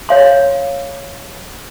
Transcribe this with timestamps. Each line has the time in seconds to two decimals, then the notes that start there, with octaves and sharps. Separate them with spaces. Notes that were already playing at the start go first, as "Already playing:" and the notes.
0.09 C#5 F5 C6